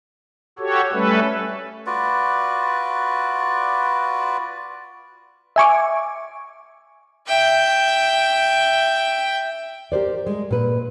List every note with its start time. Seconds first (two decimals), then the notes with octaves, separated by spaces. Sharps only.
0.59 F#4 G4 A4 C#5
0.93 G3 A3 C#4 A4 B4
1.87 F4 F#4 B4 D5
5.56 E5 G#5 C#6 D6
7.27 E5 G5
9.92 G4 A#4 C5 D5
10.27 G#3
10.51 A#2 B4